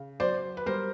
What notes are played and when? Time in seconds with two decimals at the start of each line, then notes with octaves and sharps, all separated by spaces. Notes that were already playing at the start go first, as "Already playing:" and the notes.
Already playing: C#3
0.20 F#3 C5 D5
0.57 B4
0.66 G3 A#4 C5